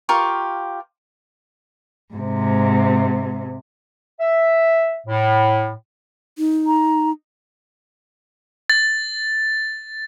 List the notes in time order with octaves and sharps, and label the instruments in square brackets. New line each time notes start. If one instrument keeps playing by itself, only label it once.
[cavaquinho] F4 G4 A#4 C#6
[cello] G#2 C3
[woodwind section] E5
A2
[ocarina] D#4
[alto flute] A#5
[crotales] A6